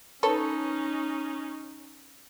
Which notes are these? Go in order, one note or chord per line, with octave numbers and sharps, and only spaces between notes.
C#4 D#4 A4 B4 C#5